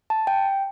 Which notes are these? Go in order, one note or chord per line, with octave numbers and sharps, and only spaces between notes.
A5
G5